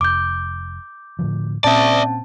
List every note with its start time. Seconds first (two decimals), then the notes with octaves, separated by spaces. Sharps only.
0.01 F1 D6 G6
1.19 A2 D3 F3
1.64 A#2 C4 C#4 D5 E5 A5